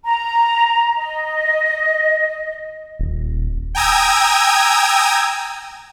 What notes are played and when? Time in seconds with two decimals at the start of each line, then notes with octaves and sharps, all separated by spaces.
0.05 A#5
0.97 D#5
2.99 D#1
3.75 G5 G#5 A#5 D#6 E6 G#6